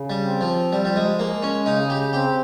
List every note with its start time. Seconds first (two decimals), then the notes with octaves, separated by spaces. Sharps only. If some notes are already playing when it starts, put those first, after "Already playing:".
Already playing: C#3
0.10 G3
0.25 C4
0.41 F3
0.72 F3 G3
0.85 G3
0.96 G#3
1.19 G#3 A#3
1.43 C#4
1.65 C#3 D#4
1.90 G4
2.13 C4 G4